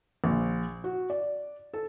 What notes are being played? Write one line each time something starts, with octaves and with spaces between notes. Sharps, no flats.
A#1
F#4
D5
A4